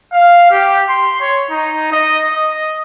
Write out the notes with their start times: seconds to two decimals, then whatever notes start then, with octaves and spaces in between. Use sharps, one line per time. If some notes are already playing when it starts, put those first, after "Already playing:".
0.13 F5
0.51 G4
0.89 C6
1.21 C#5
1.51 D#4
1.93 D#5
2.33 D#5